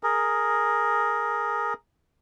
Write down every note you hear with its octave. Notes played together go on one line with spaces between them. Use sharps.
G#4 A#4